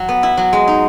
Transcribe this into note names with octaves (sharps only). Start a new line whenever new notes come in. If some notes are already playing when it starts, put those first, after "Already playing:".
Already playing: F#3
B3
E4
F#3
G#3
D#4